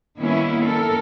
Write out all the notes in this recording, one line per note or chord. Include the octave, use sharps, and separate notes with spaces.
D#3 G3 A#3 B3 C#4 E4
A4 A#4